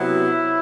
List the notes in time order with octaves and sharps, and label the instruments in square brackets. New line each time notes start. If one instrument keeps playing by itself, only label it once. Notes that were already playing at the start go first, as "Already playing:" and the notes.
Already playing: [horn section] C3 F#3 B3 E4